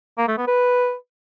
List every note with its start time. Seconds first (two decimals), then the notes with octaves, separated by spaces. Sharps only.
0.18 A#3
0.28 A3
0.38 B3
0.48 B4